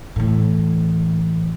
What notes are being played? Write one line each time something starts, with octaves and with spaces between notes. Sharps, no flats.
A2 E3